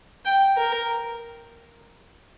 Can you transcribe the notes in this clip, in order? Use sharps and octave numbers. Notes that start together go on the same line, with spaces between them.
G5
A#4